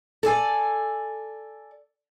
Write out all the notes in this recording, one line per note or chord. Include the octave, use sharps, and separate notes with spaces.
A4 D5 G#5